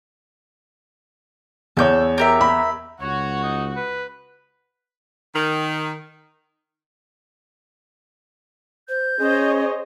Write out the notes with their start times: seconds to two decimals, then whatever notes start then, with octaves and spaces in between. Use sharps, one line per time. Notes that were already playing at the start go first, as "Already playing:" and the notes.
1.77 E2 A4 C#5 G6
2.18 G4 A#4 E5
2.41 B5
3.01 C#2 F#4 C#5
3.43 D#4
3.76 B4
5.34 D#3
8.89 C5 G6
9.19 C#4 G#4 C5 C#5 D#5